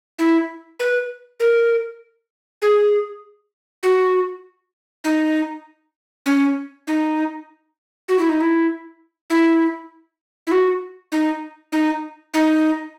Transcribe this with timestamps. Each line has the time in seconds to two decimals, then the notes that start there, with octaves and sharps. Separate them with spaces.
0.19 E4
0.80 B4
1.40 A#4
2.62 G#4
3.83 F#4
5.04 D#4
6.26 C#4
6.87 D#4
8.08 F#4
8.19 E4
8.29 D#4
8.41 E4
9.30 E4
10.47 E4
10.52 F#4
11.12 D#4
11.72 D#4
12.34 D#4